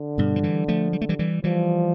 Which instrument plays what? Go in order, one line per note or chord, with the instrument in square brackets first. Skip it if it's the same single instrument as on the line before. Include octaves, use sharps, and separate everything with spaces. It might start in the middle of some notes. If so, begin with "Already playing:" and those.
Already playing: [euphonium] D3
[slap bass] G2 B2
F3
E3 G3
F3 A3
G3
A3
E3 G3
E3 G3
[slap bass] E3 G3 [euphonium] F3